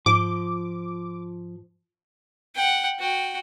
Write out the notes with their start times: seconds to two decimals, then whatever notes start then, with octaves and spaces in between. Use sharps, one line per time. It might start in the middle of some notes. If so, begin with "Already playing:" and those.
0.06 G#2 F3 D6
2.55 F#5 G5
2.99 F#4 G5